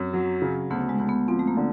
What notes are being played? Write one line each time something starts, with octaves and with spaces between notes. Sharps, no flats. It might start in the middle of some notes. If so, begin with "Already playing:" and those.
Already playing: F#2 C4
F#3
C#3
D2 B3
G#3
D2
B3
F3 C4
A3
A#3
D3